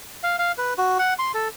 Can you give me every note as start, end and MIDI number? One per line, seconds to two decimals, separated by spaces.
0.23 0.36 77
0.39 0.52 77
0.58 0.74 71
0.78 0.98 66
0.99 1.14 78
1.19 1.32 84
1.34 1.48 69